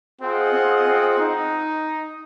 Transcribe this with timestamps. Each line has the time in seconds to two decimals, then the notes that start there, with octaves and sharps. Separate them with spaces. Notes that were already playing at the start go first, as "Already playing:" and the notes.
0.21 C4 F4 G#4 D#5 F#5
0.54 C4
0.87 C4
1.19 D#4